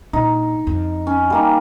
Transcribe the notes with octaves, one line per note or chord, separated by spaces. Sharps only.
A#2 D#4
F2
C#4
G3 A#3 D#4